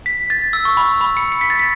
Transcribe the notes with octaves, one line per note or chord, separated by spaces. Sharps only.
B6
A6
E6
C#6
B5
B5
C#7
C#7
B6
A6
B6